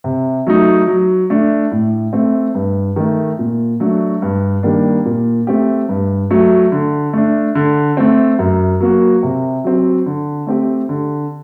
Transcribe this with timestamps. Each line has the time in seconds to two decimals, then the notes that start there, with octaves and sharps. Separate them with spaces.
0.04 C3
0.47 F#3 A3 D#4
0.87 F#3
1.30 A3 D4
1.72 A2
2.13 A3 C4
2.55 G2
2.96 D#3 A3
3.39 A#2
3.80 F#3 A3 D4 F#4
4.22 G2
4.63 D#3 G3 A#3 D4
5.05 A#2
5.47 A3 C4 G4
5.89 G2
6.30 F#3 A3
6.72 D3
7.14 A3 D4
7.55 D3
7.97 A3 C4
8.39 F#2
8.80 F#3 A#3 F#4
9.23 C3
9.64 F#3 C4
10.06 D3
10.47 A3 C4 G4
10.89 D3